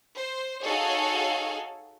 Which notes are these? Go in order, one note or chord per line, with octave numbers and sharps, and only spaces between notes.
C5
D#4 F#4 G#4 A4 C#5 F5